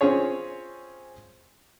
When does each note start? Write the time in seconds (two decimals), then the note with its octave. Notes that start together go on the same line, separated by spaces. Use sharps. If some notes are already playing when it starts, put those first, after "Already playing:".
0.01 C4 C#4 F4 G#4 C#5